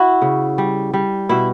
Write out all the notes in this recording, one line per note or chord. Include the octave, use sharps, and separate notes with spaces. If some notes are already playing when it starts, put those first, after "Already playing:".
Already playing: E4 F#4
C#3
G3
G3
B2 E4